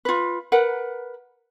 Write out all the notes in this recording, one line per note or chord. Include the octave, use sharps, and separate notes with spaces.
F4 B4
A#4 B4 F#5